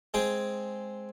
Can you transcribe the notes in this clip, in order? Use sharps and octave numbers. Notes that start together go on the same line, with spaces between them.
G#3 C4 G#4 G5